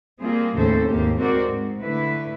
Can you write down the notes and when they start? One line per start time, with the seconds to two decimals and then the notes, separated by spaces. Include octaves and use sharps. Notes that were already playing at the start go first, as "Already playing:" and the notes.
0.20 G3 A#3 C4 F4 G#4
0.56 D#2 A2 C#3 C4 A4 C5
0.87 D#2 G#2 A#3 G4
1.18 G#3 C4 F#4 A#4 C5 D5
1.50 G#2
1.82 D3 A3 E4 B4